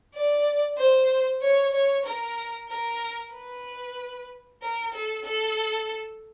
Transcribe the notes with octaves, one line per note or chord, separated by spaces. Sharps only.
D5
C5
C#5
C#5
A#4
A#4
B4
A#4
A4
A4